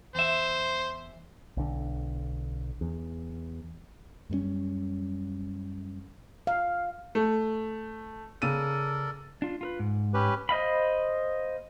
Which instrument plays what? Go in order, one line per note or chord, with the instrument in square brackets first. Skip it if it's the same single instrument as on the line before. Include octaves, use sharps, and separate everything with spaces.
[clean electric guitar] E2 E5 [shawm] C5
[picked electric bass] B1 D3
E2
[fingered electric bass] F#2 G3 A#3 C#4
[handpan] F5
[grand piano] A3
[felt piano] C#3 D#7 [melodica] A4 A#4 D5
[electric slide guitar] D4 F4
F4 A#4 B4
G#2
[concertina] C#4 G4 B4
[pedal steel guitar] C5 D#5 F5 B5